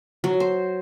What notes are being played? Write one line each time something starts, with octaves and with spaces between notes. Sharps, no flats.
F#3
C5